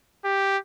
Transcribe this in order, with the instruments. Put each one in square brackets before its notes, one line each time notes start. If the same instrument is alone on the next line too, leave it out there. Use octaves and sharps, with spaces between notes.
[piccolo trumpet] G4